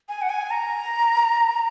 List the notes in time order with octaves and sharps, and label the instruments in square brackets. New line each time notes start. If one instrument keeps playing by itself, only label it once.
[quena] G#5
F#5
G#5
A#5